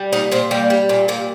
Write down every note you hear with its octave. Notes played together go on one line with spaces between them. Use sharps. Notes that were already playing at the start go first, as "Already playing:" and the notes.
Already playing: G3
A#2 D#4
A#2 C4
G3 A#3
G3
A#2
G3 A#3